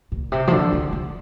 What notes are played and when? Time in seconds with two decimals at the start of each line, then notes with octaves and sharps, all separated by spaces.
0.12 A#2
0.32 C3
0.48 F3
0.52 D3
0.73 D3
0.92 D3